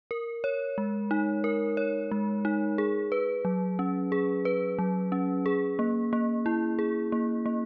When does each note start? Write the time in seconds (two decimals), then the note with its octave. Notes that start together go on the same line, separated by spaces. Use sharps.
0.11 A#4
0.44 C#5
0.78 G#3
1.11 D#4
1.44 A#4
1.77 C#5
2.11 G#3
2.45 D#4
2.78 G#4
3.12 B4
3.45 F#3
3.79 C#4
4.12 G#4
4.45 B4
4.79 F#3
5.12 C#4
5.46 G#4
5.79 A#3
6.13 A#3
6.46 E4
6.79 G#4
7.12 A#3
7.46 A#3